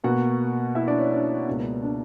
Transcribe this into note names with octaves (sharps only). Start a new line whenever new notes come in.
B2 A#3 F#4 F#5
E4 E5
D4 D5
C#4 C#5
D4
C#2 B2 A#3
D4